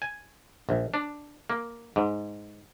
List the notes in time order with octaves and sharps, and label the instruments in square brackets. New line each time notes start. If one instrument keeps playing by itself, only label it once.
[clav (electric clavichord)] G#5
A#1
D4
A#3
G#2